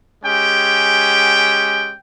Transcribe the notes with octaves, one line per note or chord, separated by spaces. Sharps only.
G#3 C#4 G4 G5